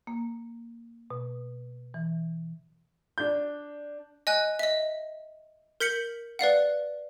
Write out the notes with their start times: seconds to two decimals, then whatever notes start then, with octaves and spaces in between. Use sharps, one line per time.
0.07 A#3
1.10 B2
1.94 E3
3.18 D4 G6
4.27 D#5 G#5 F#6
4.59 D#5 E5
5.80 A#4 G6 B6 C#7 F#7
6.39 B4 D5 F5 F#5